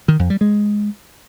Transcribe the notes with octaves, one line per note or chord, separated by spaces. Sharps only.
D#3
F2
G3
G#3